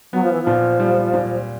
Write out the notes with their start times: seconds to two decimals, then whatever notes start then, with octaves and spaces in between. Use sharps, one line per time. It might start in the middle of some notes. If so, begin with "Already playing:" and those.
0.13 F#3 B3
0.23 F3
0.32 E3
0.42 A#2 F3
0.80 G3
1.14 A#2